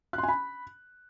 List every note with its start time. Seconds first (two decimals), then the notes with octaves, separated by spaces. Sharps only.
0.13 F#6
0.18 C6
0.23 G#5
0.28 B5